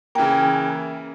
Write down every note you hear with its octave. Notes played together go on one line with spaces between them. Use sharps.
C#3 E3 A#3 G5